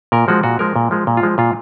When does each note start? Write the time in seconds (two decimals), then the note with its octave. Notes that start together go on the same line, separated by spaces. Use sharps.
0.12 A#2 A#4
0.28 F3 G#3 F#4
0.43 A#2 F#4
0.59 F3 G#3 A#4
0.76 A#2
0.91 F3 G#3
1.07 A#2
1.17 F4
1.23 F3 G#3
1.38 A#2 F4